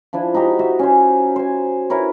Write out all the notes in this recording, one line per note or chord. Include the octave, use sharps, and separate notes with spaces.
F3 D4 E4
D#4 F#4 G4 A#5
F#4 E5
C#4 C5
C5 G#5
E4 A#4 B4 C#5